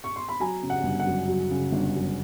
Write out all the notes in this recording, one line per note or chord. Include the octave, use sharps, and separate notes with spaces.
C#6
C6
B5
F#3 G#5 A#5
C#3
F#5
G1
F#5
F#2
F#3
C#3
G1
F#2